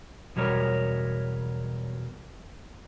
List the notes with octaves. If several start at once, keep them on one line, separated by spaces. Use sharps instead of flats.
E2 B2 F#3 G3 A#4 C#5